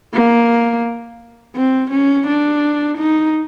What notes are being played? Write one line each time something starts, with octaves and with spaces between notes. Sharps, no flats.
A#3
C4
C#4
D4
D#4